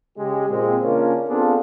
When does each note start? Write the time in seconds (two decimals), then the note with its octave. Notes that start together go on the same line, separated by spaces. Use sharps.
0.18 C#3 G#3 G4
0.49 A#2 G#3 C4
0.83 C#3 A#3 C#4 D4 F4 A#4
1.29 B3 C4 D4 F4 G#4 A4